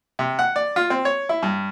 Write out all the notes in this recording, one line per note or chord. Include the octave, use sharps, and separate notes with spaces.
C3
F#5
D5
F4
C4
C#5
E4
G2